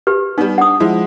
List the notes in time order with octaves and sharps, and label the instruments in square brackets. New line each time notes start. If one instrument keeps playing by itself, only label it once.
[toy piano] G4 B4
[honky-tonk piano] G3 B3 [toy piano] D#4
[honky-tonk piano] D4 [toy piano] F#5 D#6
[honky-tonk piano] F3 G#3 E4